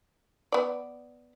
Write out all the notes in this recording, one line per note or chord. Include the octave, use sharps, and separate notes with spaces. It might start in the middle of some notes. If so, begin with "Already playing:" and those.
B3 D5